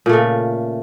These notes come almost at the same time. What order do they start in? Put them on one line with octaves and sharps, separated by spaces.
A#2 A3 C#3